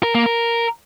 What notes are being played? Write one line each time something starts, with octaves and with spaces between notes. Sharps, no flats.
A#4
A#3
A#4